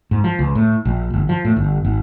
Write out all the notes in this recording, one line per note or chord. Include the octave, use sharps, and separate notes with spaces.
G#2
F3
C#2
A2
A#1
G1
F3
A2
G1
G#1